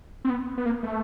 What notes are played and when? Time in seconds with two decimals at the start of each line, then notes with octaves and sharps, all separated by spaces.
0.25 C4
0.30 B3
0.57 B3
0.66 A#3
0.83 A3